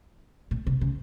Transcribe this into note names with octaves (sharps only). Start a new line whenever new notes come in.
A#2
C3
C#3